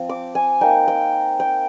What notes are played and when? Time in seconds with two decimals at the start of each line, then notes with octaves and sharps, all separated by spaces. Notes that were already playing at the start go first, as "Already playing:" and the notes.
Already playing: F3 C4
0.09 D6
0.35 G#5
0.61 A#3 D#4 G5
0.88 G5
1.40 G5